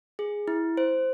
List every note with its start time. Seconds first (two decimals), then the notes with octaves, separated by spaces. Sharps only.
0.19 G#4
0.48 E4
0.77 C5